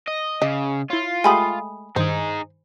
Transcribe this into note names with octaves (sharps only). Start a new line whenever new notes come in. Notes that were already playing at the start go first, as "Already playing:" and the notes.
D#5
C#3 D#5 D6
E4 F4 C#5
G#3 A3 G4 G#5 B5 D#6
G2 D#3 D#4 G#4 C5